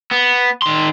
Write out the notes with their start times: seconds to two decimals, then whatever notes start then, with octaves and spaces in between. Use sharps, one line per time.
0.11 B3
0.62 D#3 C6